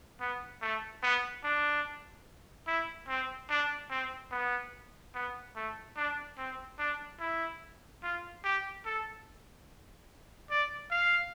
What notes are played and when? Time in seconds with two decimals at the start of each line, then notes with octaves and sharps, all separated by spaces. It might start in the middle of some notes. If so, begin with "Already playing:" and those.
0.20 B3
0.62 A3
1.03 B3
1.44 D4
2.67 E4
3.08 C4
3.50 D4
3.90 C4
4.31 B3
5.15 B3
5.56 A3
5.97 D4
6.38 C4
6.79 D4
7.20 E4
8.03 F4
8.44 G4
8.86 A4
10.51 D5
10.91 F5